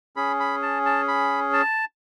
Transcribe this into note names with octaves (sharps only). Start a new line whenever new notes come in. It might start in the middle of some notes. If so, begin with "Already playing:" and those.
C#4 G#4 B5
B5
A5
A5
B5
A5